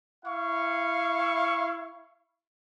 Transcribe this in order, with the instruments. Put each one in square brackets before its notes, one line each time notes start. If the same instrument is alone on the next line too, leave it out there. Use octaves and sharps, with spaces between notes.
[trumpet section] E4 F5 C#6